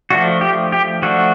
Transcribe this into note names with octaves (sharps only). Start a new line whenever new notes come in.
F3 A3 D4 F#4
G4
G4
F3 A3 D4 F#4